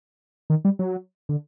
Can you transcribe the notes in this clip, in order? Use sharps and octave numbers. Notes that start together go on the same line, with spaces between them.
D#3
G3
F#3
D3